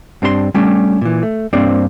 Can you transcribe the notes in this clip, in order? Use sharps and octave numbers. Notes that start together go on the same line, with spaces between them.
G2 C4 D4 A#4 C6
G3 A3 C#4 D4 G4 C#5
A#2 E3
A3
G2 A#3 C4 D4 C5 D5